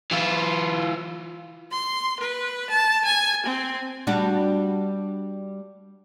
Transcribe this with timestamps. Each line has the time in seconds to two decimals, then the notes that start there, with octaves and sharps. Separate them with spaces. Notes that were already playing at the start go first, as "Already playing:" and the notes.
0.11 E3 F4
1.72 C6
2.20 B4
2.70 A5
3.05 G#5
3.46 C4
4.07 G3 D4 F#4